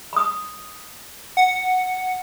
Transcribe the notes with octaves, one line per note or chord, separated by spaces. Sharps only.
B5 D#6
F#5